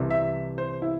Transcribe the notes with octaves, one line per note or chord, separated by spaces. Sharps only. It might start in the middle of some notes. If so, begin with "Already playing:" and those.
Already playing: C2 C3 E3
E5
C5
E4